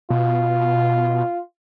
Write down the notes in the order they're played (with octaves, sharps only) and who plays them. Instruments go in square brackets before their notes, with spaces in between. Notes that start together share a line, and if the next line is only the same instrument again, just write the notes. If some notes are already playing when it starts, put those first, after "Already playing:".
[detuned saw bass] B2 [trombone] F4